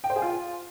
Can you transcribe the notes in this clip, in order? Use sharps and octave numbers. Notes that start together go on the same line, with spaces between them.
G5
C5
G#4
F4